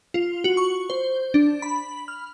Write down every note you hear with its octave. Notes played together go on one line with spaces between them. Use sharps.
F4
F#4
C#6
C5
D4
B5
F6